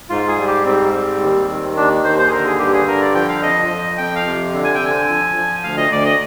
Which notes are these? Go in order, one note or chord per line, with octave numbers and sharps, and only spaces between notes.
G#2 F4
G#4
G3
G4
G#2 C4
G3
D#2
D#3
D#2 D4
D#2 C5
C5
G#4
D3 A#4
G#4
G2 G4
G#4
D3 A#4
D5
F3 G5
F5
F2 D#5
F3
F2 G5
F5
C3
D3
G#5
G5
D3 G#5
F3
F3
D2 F5
D#5
D2 D5
D#5